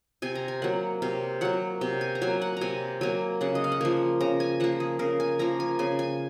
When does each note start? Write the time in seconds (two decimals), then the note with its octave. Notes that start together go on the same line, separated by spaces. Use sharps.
0.22 C3 G#5
0.35 A#5
0.48 G#5
0.62 F#3 A#3 F#5
1.02 C3 F5
1.41 F#3 A#3 F#5
1.81 C3
2.01 G#5
2.15 A#5
2.21 F#3 A#3 G#5
2.42 F#5
2.57 C3 G#5 A#5
3.01 F#3 A#3 G#5
3.41 C#3 F#5
3.55 D#5
3.64 F5
3.72 F#5
3.81 F3 A#3 G#5
4.20 C#3 A#5
4.40 G#5
4.60 F3 A#3 F#5
4.80 G#4
4.99 C#3 A#4
5.20 G#5
5.39 F3 A#3 A#5
5.60 G#5
5.79 C#3 G#5
5.99 G#5